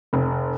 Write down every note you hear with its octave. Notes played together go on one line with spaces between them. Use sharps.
F1